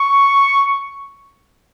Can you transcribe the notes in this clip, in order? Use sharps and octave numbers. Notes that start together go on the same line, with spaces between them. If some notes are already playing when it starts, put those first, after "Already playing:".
Already playing: C#6